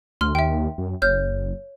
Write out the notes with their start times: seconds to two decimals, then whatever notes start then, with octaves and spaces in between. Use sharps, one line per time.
0.21 D2 C6 F6
0.35 D#2 E5 G5
0.78 F#2
1.02 F#1 C#5 F6 G6